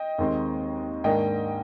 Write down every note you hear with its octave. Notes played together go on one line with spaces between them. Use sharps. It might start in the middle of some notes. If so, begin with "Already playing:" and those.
Already playing: D#5 G5
D#2 D#3 G#3 C4
G#2 D#3 A#3 D4 D#5 G5